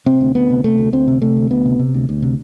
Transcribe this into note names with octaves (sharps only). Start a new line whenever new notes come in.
C3 C4
D2
D2 B3
C3
C3 A3
D2
D2 C4
C3
C3 A3
D2
D2 B3
C3
C3
D2
D2
C3